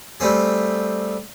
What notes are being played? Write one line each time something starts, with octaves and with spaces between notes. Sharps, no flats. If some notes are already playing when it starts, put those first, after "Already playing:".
G3 A3 C4 G#4